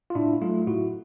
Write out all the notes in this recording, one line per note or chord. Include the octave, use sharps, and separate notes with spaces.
F4
A2 D4 E4
F#3 A3 D#4 F4
A2 E4 F#4